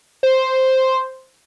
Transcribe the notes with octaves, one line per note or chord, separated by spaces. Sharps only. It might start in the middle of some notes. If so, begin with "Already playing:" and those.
C5